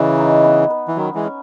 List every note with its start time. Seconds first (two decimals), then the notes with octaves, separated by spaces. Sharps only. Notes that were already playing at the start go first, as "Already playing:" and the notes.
Already playing: C#3 E3 D#5
0.18 D#4
0.44 B3
0.70 B4
0.88 E3
0.96 D#3 F#3 C#4
1.14 E3 G#3
1.24 C#4